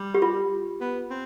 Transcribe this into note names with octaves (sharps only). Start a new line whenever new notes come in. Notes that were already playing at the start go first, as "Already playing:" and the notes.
Already playing: G3
G4
F4
B3
C4